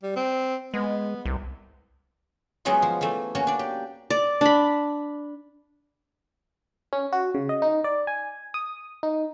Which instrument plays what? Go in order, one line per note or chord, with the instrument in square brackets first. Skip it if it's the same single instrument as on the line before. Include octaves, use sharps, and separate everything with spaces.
[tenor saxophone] G3
C4
[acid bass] G#3 [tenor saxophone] B3
[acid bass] C2
[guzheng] F#3 G#3 B3 C#4 D#4 F4
F3
E3 A3
A#3 C#4 F#4
D4 D5
G4
[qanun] D5
D4 B5
[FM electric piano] C#4
F#4
C#3
D#5
D#4
D5
G#5
D#6
D#4